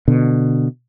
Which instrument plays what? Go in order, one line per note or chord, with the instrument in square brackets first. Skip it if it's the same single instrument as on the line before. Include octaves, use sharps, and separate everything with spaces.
[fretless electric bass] B2 D3